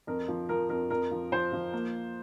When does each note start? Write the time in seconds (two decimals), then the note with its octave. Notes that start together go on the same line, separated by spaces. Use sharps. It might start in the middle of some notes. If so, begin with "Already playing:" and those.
0.07 F2 A#4
0.28 F3
0.49 F3 A#4
0.70 F2 A#4
0.90 F2 A#4
1.11 F3
1.32 F3 C5
1.52 F3
1.73 A#3